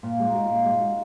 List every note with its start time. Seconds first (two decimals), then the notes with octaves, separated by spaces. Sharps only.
0.03 A#2 F4
0.20 G#3 D#4
0.34 F#4
0.44 F4
0.49 A#2
0.65 G#3
0.81 F#4